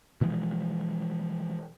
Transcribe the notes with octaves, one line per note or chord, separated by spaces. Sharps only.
B2 E3 F3 G#3